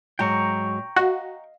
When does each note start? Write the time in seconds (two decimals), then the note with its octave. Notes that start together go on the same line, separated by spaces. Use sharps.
0.19 G#2 F#3 G#3 G5 A#5 C#6
0.96 F#4 D#5 F5